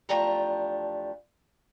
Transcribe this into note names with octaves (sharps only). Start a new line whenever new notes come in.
E2 F3 A3 D4 G4 A#5